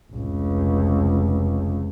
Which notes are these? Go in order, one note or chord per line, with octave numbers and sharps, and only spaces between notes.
F1 C#2